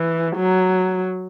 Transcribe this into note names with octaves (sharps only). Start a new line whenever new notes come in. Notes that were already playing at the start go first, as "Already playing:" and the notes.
Already playing: E3
F#3